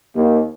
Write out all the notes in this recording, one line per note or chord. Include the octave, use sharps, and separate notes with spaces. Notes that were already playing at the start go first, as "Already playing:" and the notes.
D#2